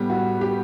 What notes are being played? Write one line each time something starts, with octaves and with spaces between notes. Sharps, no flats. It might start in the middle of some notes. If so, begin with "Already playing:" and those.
Already playing: A2 G3 B3
F#4
G4